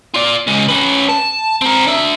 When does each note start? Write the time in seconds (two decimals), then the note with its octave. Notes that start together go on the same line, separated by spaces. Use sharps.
0.14 F4 D5
0.47 C#3 G#3
0.68 C#4 B4
1.09 A5
1.62 C4 A#4
1.87 D4 E5